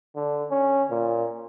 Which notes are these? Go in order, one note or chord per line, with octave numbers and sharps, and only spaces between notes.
D3
C#4
A#2